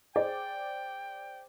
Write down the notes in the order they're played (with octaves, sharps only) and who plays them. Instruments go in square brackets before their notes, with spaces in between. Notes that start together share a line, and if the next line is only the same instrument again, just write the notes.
[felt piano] G#4 C5 D5 [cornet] G5